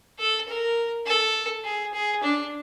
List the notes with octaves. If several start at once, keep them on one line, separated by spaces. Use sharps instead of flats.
A4
A#4
A4
G#4
G#4
D4